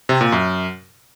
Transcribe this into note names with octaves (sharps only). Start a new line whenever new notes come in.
C3
A#2
F#2